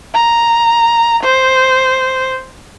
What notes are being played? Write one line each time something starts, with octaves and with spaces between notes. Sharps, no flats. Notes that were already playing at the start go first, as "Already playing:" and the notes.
A#5
C5